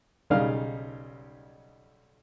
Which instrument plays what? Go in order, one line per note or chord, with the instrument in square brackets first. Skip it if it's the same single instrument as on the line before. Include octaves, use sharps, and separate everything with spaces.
[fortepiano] B1 C#3 G3 D#4 F5 F6